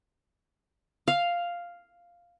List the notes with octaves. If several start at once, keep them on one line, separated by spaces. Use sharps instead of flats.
F5